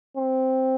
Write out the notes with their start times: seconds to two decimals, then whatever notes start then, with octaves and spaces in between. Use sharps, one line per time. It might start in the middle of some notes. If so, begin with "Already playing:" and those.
0.17 C4